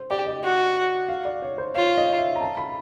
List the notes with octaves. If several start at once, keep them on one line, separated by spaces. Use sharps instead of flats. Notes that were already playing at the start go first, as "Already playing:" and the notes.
Already playing: C5
G4 D5
D#5
F#4
F5
D5
C#5
C5
F4 C#5
D#5
E5
A#5
A5
B5